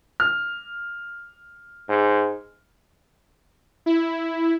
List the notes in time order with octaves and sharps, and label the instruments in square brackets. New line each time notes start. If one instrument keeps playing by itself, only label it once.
[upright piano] F6
[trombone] G#2
[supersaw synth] E4